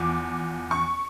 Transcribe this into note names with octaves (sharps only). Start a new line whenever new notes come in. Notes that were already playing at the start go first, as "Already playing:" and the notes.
Already playing: E2 F3 D6
C#6